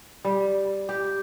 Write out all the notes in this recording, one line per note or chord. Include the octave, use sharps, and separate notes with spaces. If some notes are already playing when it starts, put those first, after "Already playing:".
G3
G4